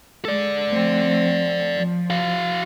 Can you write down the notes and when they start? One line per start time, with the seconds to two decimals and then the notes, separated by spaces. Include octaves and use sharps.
0.25 G#3 A4 D5
0.70 F3 A3 C4
1.74 F3
2.10 F#4 F5